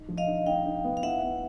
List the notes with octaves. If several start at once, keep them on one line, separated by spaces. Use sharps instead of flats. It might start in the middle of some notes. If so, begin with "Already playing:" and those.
Already playing: D#4
F3
D#5 F5
D#4
D#4 F5 G5
D#4
B3
F5
E4 E5 F#5
B3